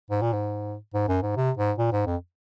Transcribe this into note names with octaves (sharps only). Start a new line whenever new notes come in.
G#2
A#2
G#2
G#2
F#2
G#2
C3
G#2
A#2
G#2
F2